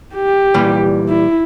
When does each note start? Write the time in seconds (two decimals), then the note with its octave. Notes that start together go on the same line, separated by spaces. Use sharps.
0.15 G4
0.54 A#2 E3 G3
1.08 E4